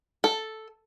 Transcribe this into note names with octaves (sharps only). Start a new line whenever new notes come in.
A4